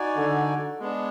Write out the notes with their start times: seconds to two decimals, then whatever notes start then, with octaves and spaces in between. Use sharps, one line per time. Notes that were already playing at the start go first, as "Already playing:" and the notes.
Already playing: D#4 F#4 D5 G#5
0.17 D3
0.80 G#3 B3 D4